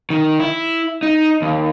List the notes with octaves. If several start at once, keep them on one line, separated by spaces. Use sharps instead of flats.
D#3
E4
D#4
D#2